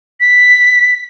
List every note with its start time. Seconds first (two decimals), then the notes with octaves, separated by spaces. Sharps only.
0.20 B6